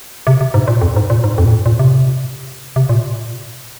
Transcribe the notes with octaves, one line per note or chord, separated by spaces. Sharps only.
C3
C3
G#2
A#2
F2
G#2
A#2
G#2
F2
A#2
G#2
A#2
C3
C3
A#2